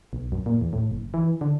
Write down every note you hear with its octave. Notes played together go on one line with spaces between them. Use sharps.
B1
F#2
A#2
E2
A2
F#1
E3
D3